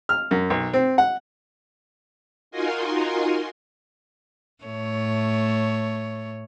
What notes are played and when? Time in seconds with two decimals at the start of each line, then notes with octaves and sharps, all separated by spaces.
0.09 F6
0.31 F#2
0.50 B1
0.73 C4
0.98 F#5
2.51 D#4 F4 F#4 A#4 G#5 C6
4.64 A2 A3 C#5